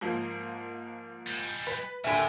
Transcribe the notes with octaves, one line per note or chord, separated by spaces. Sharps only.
G#2 F3 A#3
G3 G#3
B4
D#2 A2 D3 E5 G#5 B5